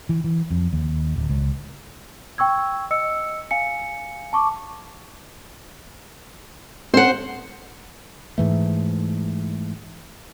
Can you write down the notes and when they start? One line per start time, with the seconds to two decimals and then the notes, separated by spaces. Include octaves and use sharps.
0.09 E3
0.24 E3
0.51 F2
0.73 D#2
1.16 D1
1.29 C#2
2.38 G5 C#6 E6 G#6
2.91 D#5 E6 C#7
3.51 F5 G#5 C#7
4.33 A5 C#6 D6
6.94 C4 C#4 A4 C5 F#5
8.38 G#2 E3 A3